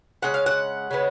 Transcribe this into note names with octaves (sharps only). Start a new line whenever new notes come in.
C#3 G#3 F#5
F5
F#5
C#3 G#3 B3